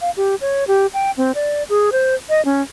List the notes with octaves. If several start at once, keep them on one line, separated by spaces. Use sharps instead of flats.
F5
G4
C#5
G4
G5
C4
D5
G#4
C5
D#5
C#4